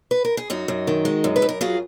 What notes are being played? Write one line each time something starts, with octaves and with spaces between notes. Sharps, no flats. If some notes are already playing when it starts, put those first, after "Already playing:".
B4
A#4
G#4
F#2 D#4 F#4
F#2
D#3
G#3
F#2
B4
F#2
A#4
F#3 F4 G#4